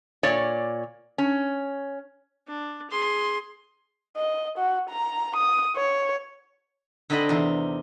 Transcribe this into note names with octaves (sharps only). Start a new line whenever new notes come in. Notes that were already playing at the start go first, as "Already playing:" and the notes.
A#2 C#5 D5
C#4
D4
G#4 C6
D#5
F#4
A#5
D#6
C#5
D3 C4 D#4 G4 D#5 B5
E2 C3 D#4